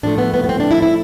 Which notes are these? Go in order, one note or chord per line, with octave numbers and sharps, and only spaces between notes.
A2 F3 A3 D4
B3
B3
B3
C4
D4
E4
E4